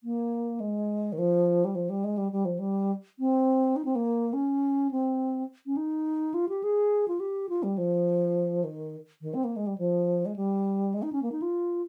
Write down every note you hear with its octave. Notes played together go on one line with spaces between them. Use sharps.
A#3
G#3
D#3
F3
G3
F3
G3
G#3
G3
G3
F3
G3
C4
D#4
C4
A#3
C#4
C4
C#4
D#4
F4
G4
G#4
F4
G4
F4
G3
F3
D#3
D#3
C4
A#3
G#3
G3
F3
G#3
G3
G#3
D#4
C#4
A#3
D#4
F4